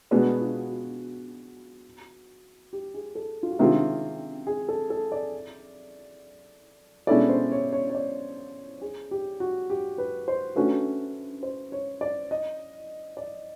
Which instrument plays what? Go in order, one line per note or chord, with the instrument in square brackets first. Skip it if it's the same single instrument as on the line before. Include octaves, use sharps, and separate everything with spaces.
[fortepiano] B2 G#3 B3 D4 [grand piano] F#4
[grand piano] F4
F#4
G4
G#4
A4
F4
F#4
[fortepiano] C3 D#3 G#3 C4 F4 [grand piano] G4
[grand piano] G#4
A4
A4
D5
[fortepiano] B2 G#3 C#4 E4 A4 [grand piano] D5
[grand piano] C5
C#5
C#5
C#5
D5
G#4
G4
F#4
G4
B4
C5
[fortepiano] A3 C#4 F#4 [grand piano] B4
[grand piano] C5
C#5
D5
D#5
D5